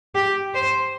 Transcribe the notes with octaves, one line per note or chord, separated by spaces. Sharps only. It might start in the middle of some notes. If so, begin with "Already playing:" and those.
G4
C5